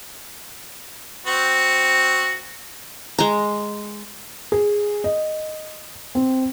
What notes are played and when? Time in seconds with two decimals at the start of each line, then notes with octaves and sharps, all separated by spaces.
1.27 C4 F#4
3.18 G#3 A#5
4.52 G#4
5.04 D#5
6.15 C4